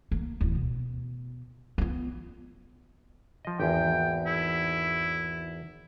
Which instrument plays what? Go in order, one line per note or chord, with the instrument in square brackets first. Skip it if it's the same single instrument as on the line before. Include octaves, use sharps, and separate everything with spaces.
[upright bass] A#3
D1 E2
B2
B3 F4
[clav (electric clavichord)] F3 D#5
[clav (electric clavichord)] G#1 E2 [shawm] G5
[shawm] E4